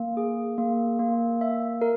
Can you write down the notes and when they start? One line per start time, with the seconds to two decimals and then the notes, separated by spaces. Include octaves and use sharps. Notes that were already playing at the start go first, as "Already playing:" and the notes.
Already playing: A#3
0.17 G#4
0.58 A#3
0.99 A#3
1.41 E5
1.81 A#4